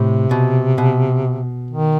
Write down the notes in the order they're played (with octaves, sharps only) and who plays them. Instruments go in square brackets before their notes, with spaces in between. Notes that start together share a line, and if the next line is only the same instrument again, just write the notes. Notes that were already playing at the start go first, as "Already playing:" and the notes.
Already playing: [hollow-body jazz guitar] A2 [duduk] C3
[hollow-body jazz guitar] B2
B2
[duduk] D#3